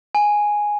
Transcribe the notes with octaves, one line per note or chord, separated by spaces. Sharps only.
G#5